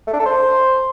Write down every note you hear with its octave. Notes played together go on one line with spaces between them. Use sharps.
A3
D4
A4
C5